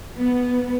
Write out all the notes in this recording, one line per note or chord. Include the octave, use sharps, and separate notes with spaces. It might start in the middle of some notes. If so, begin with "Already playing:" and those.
B3